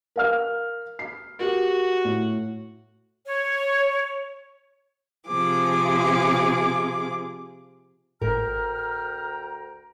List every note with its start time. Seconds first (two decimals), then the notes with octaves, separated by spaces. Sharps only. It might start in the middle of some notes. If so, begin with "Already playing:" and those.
0.16 A#4 F5 F6
0.99 C7
1.39 F#4 G4 A#4
2.05 A2
3.26 C#5
5.26 C3 F3 G#4 D6
8.22 G#1 D2 A2 A#4 G5 A#5 F6